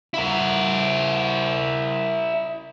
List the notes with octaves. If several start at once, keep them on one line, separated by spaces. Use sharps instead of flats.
E4 A#4